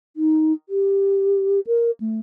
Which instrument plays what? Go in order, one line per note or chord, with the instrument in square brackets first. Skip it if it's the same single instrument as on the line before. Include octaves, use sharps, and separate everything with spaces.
[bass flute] D#4
G4
A#4
A3